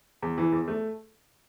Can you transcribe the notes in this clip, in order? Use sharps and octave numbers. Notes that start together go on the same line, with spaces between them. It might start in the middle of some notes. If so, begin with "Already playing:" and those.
E2
E3
E2
A3